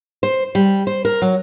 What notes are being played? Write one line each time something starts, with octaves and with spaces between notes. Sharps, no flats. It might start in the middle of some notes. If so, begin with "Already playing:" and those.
C5
G3
C5
A#4
F#3